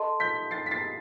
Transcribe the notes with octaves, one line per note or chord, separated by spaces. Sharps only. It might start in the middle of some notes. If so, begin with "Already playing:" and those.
Already playing: A4 D#5 A5 C6
G6 B6
A6 C7
B6
A6 C7